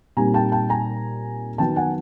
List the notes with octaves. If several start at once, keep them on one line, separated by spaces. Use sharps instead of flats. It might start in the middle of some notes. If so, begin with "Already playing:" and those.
A#2 G3 C4 D#4 G#5 A#5
G5 A5
G5 A5
G#5 A#5
D#3 F#3 B3 G5 A5
F#5 G#5